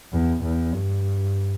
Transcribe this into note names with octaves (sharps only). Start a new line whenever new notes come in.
E2
E2
G2